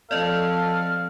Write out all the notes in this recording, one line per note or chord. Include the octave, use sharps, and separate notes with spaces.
F3 C4 A4 D5 D#5 F5